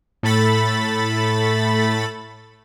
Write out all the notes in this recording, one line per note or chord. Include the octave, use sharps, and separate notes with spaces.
A2 A3 A4 B5 A6